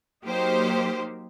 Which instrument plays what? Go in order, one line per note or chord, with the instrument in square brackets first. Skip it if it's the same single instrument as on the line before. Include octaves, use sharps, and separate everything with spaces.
[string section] F#3 A#3 D#4 G4 C5